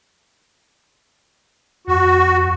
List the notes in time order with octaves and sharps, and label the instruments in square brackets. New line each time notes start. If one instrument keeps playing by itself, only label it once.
[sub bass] F2 [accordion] F#4